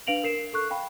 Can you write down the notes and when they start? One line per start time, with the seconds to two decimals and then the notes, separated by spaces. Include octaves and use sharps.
0.07 D4 B4 F5 D7 F7 F#7
0.24 A#4 C7 E7
0.53 A4 C#6 F#6
0.70 F5 G5 B5